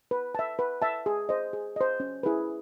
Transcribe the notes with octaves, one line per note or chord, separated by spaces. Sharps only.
B4
E5 A5
B4
E5 A5
G#4
C5 D#5
G#4
C5 D#5
C#4
E4 G#4 B4